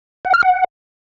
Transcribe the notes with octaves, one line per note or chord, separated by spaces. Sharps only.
F#5
F6
F#5